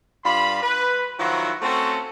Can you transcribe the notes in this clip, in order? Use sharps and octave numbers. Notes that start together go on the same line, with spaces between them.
G2 F4 B5
B4
D#3 F3 F#3 E4 F#4
A3 C4 C#4 F#4 A4